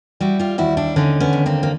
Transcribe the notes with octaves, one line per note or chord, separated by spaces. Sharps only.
G3 E4 F#4
F4 G4
D#2 E4 F#4
D4 E4
D3 C#4 D#4
B3 C#4
D#2
A#3 C4
A#3